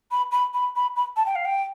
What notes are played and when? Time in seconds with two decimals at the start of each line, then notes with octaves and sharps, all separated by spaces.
0.11 B5
0.32 B5
0.54 B5
0.76 B5
0.96 B5
1.16 A5
1.26 G5
1.35 F5
1.45 G5